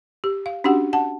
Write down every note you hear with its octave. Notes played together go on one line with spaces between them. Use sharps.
G4
F5
C#4 D4 F#4 G4 F#5
F#5 A5